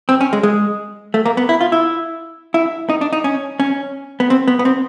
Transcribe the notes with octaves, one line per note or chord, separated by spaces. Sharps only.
C4
C#4
G#3
G#3
A3
A#3
B3
E4
F4
E4
E4
D#4
D4
D#4
C#4
C#4
B3
C4
B3
B3
C4